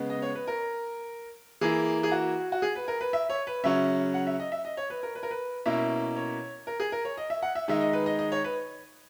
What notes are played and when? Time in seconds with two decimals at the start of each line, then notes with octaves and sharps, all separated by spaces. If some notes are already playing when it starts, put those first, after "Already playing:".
Already playing: C#3 G#3 B3
0.10 D#5
0.22 C#5
0.35 B4
0.47 A#4
1.61 E3 A#3 E4 G#4
2.03 G#4
2.12 F#4
2.52 F#4
2.62 G#4
2.76 B4
2.88 A#4
3.01 B4
3.13 E5
3.30 C#5
3.47 B4
3.63 C#3 F#3 C#4 E5
4.14 F#5
4.27 E5
4.40 D#5
4.52 E5
4.65 D#5
4.77 C#5
4.90 B4
5.03 A#4
5.15 B4
5.23 A#4
5.31 B4
5.66 B2 A#3 C#4 E4 E5
6.16 C#5
6.67 A#4
6.80 G#4
6.92 A#4
7.05 C#5
7.17 D#5
7.30 E5
7.43 F#5
7.55 E5
7.68 D#3 G#3 D#4 E5
7.81 D#5
7.93 B4
8.06 D#5
8.19 D#5
8.32 C#5
8.44 B4